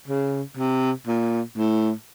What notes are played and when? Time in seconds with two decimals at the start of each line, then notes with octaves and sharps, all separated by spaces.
0.08 C#3
0.57 C3
1.07 A#2
1.57 A2